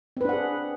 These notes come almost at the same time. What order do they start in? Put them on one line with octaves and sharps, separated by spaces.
C4 B4 D4 F#5 G#4